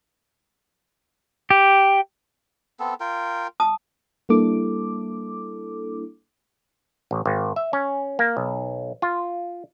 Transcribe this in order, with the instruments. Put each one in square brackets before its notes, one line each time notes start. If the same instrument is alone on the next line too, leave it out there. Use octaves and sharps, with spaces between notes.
[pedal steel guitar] G4
[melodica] B3 C4 A4
F4 A#4 G5
[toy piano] A5 D#6
[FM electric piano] G3 A#3 D4 E4 A4 D6
[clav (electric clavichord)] A1
G#1
E5
C#4
A#3
B1
F4